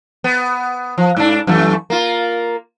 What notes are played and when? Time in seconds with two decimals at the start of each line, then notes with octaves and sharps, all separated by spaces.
0.24 B3
0.98 F3
1.17 G#2 D4
1.47 F#2 E3 A3
1.90 A#3 F4